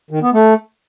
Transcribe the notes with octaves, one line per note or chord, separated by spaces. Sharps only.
D#3
B3
A3